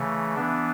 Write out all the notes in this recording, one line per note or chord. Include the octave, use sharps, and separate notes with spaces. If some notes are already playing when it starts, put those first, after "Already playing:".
Already playing: C#3 E3 A3
E3 B3 D4